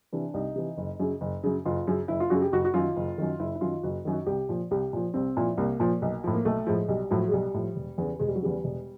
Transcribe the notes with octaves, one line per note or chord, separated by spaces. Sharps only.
C3 E3 D4
C2 D#4
C3 E3
F#1
F#2 C#3
F#1
F#2 C#3
F#1 F4
F#2 C#3
F#1 E4
F4
F#2 C#3 F#4
G4
F#1 F#4
F#4
F#2 D#3 F4
F#1
F#2 D#3
F#1 E4
E4
F#2 D#3 F4
F#1 F#4
F#2 D#3
F#4
C2 G4
A#2 F3
C2 G4
A#2 F3
C2 C4
A#2 F3 E4
C2 A#3
A#2 F3
B1
A2 F3
A#3
B1 A3
A2 F3 G#3
B1 G3
A2 F3 F#3
G#3
B1 G3
A2 F3
E1
E2 C#3
E1 G#3
G3
F#3
E2 C#3 G3
E1